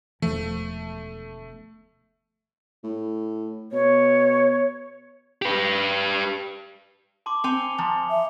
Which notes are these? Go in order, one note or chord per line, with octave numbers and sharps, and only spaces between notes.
E1 D2 F3 A3
A2
B2 C#5
G4 B4
A5 C6 D6
C4 G#5 C#7 F7 G7
F3 G#5 A#5 C6
E5